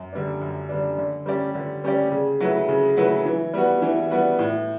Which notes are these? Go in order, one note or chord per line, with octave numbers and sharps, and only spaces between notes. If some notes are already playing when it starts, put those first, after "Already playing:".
Already playing: F#2
D3 G3 D4
F#2
D3 G3 D4
D3
G3 C#4 G4 D5
D3
G3 C#4 G4 D5
C#3
F#3 A3 E4 B4
C#3
F#3 A3 E4 B4
E3
G3 B3 F#4
E3
G3 B3 F#4
A2